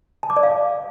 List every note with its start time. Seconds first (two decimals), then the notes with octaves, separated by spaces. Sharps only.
0.23 A5
0.30 D6
0.37 D5
0.43 F5